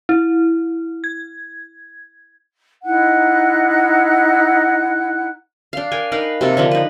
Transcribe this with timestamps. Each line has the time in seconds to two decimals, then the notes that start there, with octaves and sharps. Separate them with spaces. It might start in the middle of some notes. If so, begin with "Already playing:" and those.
0.09 E4
1.04 G#6
2.83 D#4 E4 F#5 F#6
5.73 D4 F5
5.92 A#4 G5 G#5
6.12 D#4 A#4 B4 F5
6.41 C3 A#3 A4
6.57 D3 F3 A#3
6.71 D#4 B4